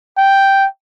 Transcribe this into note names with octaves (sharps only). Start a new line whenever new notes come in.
G5